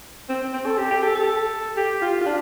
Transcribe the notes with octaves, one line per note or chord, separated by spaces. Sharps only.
C4
C4
A4
G4
G4
A4
A4
G4
F4
F4
D4